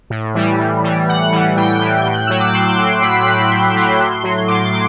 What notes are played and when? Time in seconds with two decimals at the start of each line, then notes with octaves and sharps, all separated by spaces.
0.10 A2
0.35 E3 G3
0.59 A2
0.84 E3 G3
1.08 A2 F#5
1.32 E3 G3
1.57 A2 G5
1.81 E3 G3
2.01 A2 G6
2.14 F#6
2.27 F#3 E6
2.40 D6
2.53 A2 C6
2.78 F#3
3.03 A2 B5
3.28 F#3
3.51 A2 C6
3.76 F#3 C6
3.99 A2 C6
4.24 F#3 C6
4.40 C6
4.48 A2 D6
4.73 F#3